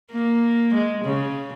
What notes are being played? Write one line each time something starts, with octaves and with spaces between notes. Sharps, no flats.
A#3
G#3
C#3